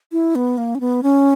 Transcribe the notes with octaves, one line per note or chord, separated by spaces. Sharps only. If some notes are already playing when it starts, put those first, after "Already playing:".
E4
B3
A#3
C#4
B3
C#4